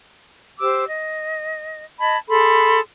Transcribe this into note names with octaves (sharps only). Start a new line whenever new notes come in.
G4 C5 D6 E6
D#5
D#5 A5 B5 G#6
G#4 A4 B5 C6